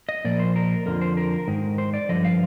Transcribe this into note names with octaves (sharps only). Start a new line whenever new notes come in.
D#5
A#2 F3 D5
C5
A#4
F2 D3 F3 A#4
C5
A#4
G#2 D#3
C5
D5
G2 D3 F3 D#5
F5